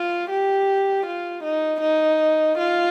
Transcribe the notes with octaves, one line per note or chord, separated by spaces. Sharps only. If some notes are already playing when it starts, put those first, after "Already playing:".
Already playing: F4
G4
F4
D#4
D#4
F4